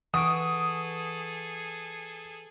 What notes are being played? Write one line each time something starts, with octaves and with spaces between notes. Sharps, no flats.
E3 G#4 A4 F#5 C#6 D#6 D7